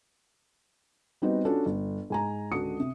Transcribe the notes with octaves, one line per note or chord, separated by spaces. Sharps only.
G3 B3 C4 D#4 F#4 D#5
C#4 D4 F4 F#4 A4
G1
G#2 G#5 A#5
C#2 D3 D4 F#4 D#6 C#7
C3